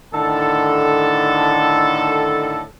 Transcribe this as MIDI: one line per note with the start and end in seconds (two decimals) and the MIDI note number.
0.14 2.62 45
0.14 2.62 50
0.14 2.62 51
0.14 2.62 69